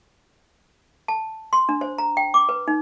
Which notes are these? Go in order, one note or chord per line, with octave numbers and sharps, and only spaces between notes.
A5
C6
D4
C5
A#5
G5
D6
B4
D#4